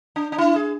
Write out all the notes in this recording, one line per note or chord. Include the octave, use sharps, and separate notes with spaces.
D4
D4
E4
G#4